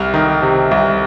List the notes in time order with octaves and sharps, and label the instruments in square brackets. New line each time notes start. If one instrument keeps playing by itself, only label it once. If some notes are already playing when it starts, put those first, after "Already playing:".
Already playing: [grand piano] C2 F6
D#3
C3
C2